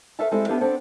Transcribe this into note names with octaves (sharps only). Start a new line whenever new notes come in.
A4 B4 C#5 E5 F5 A5
G3 G#3 C4 E4 A4
B3 D4 E4 G4 B4 F5
B3 C4 D4 A4 C5